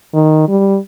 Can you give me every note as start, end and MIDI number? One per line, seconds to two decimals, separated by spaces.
0.14 0.46 51
0.48 0.78 55